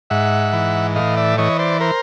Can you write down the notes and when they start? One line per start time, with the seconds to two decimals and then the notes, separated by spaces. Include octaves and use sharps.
0.10 G#2 E5 F#5
0.53 E3
0.96 A2 D#5 F5
1.17 D5 E5
1.38 E3 C#5 D#5
1.59 C5 D5
1.80 A#4 C5